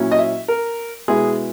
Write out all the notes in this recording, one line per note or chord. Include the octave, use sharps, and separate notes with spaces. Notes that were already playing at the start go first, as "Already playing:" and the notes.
Already playing: A#2 F#3 C#4 E4
D#5
E5
A#4
B2 G#3 B3 E4 G#4